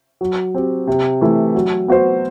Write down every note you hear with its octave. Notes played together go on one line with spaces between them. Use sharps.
F#3
C4 G4
C3
E3 A3 E4
F#3
B3 F#4 C5